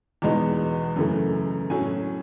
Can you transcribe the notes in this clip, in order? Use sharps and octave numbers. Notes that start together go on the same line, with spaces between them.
E2 B2 G#3 B3 D#4
F#2 C#3 E3 A3
A2 F#3 C#4 G#5